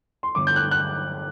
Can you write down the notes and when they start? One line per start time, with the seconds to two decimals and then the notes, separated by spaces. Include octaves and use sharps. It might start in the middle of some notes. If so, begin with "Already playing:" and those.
0.23 C6
0.35 G1 D6
0.47 G6
0.56 F#6
0.71 F#6